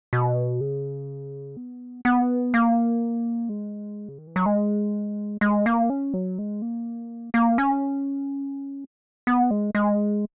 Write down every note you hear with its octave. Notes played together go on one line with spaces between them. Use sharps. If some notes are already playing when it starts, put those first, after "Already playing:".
B2
C#3
B3
B3
A#3
G#3
C#3
D#3
E3
F#3
G#3
G#3
A#3
C#4
F#3
G#3
A#3
A#3
C#4
B3
G#3
G#3